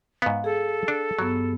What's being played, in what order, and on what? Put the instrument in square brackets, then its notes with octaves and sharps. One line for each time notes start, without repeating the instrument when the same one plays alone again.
[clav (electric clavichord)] G#2 B3 [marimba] F5
[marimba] G#4 [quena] A4
[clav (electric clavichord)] D4
[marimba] G2 B3 [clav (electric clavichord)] F#3